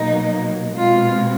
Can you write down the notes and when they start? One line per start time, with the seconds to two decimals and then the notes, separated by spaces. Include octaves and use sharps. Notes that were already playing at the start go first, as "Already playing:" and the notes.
Already playing: B2 F#3 A#3 D#4
0.77 B2 G#3 C4 F4